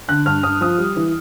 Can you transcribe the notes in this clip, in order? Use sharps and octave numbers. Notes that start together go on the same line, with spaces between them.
D3 F#6
G2 F6
G2 D#6
F3 D#6
G3
E3